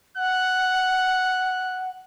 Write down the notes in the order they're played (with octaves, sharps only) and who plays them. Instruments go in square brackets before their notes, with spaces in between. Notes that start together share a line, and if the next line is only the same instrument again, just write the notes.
[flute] F#5 [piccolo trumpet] F#6